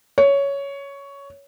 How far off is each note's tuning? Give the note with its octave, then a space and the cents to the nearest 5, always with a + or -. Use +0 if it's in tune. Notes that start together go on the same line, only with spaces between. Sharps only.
C#5 +10